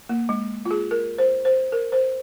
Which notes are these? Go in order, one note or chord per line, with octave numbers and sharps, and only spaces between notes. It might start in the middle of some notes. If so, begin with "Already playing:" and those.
A#3
G#3
F4
G#4
A#4
C5
C5
A#4
C5